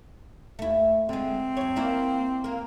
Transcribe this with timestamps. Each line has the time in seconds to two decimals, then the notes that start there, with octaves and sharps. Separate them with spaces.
0.59 D#2 A3 E4
1.09 D3 G#3 C4
1.57 F#2 C#5
1.76 A#3 E4 D5
2.44 A#3 A#4